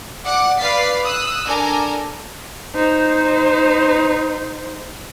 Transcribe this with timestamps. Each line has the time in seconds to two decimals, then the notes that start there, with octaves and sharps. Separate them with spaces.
0.24 D5 F#5 D6 C#7
0.59 B4 D5 F5 A6 B6 C7
1.04 D#6 E6 F#6
1.46 D4 A4 A#4 G#5 A#5
2.75 D#4 C5